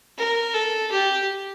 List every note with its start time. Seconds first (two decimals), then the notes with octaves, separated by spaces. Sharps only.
0.18 A#4
0.54 A4
0.91 G4